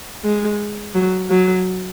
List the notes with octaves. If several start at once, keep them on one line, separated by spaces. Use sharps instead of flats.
G#3
F#3
F#3